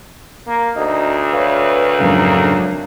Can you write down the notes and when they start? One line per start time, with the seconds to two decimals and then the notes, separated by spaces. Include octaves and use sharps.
0.47 A#3
0.76 D2 D#4
1.33 B4 C#5 E5 F5
2.00 F2 G#2 C#3 F#3 A#3 D4